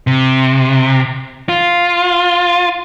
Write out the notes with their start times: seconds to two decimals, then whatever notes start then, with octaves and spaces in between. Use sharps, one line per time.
0.07 C3
1.49 F4